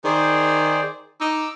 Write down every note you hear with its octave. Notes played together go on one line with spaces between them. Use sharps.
D#3 G#4 C5 D5
D#4 D6 E6